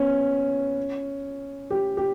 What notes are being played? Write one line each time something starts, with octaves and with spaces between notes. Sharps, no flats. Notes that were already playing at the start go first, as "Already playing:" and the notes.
Already playing: B3 C#4
G4
G4